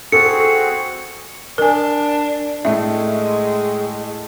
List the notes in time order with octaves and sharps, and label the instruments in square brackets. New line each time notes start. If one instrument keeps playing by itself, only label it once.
[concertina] C4 F#4 G#4 [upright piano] A4 [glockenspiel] C#7
[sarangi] D4 [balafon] A#4 G#5
[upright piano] A2 A3 [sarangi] G#3 [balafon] E5